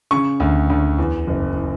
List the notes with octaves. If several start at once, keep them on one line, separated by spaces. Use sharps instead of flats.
C#3 C#6
D2
D2
E2
F#1